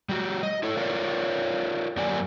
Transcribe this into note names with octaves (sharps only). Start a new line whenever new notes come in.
G3 F#4 G4
D#5
E4 A4 C#5
F4 A#4 C#5 D5 F5
F#2 A#3 G4 D5 G#5